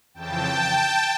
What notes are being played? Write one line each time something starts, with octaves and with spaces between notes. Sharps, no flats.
F2 C#3 E3 G5 A5